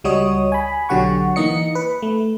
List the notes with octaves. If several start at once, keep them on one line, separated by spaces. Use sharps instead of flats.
C#2 G3 F#4 C#5 D#5 D#6
G#5 B5
B1 D3 F#3 G4 F#5 C#6
E3 A#3 D#4 D#5 C#7
B4
A3